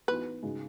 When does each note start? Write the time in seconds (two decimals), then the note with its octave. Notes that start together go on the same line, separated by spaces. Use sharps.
0.08 E3 B3 D#4 F#4 B4
0.43 C#3 G#3 D#4 F#4